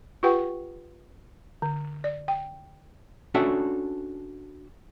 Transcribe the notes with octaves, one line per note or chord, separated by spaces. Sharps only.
F4 G4 B4 F#5 G5 C#6
D3
D5
G5
C#4 D4 F#4 A4 E5 G5